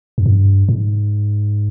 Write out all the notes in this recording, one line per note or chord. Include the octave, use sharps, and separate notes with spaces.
F2
G2
G#2